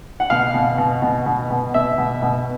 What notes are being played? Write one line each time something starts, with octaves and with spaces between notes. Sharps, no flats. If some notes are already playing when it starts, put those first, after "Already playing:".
F#5
B2 F5
B2
B2
B2
B2
B2
B2 E5
B2
B2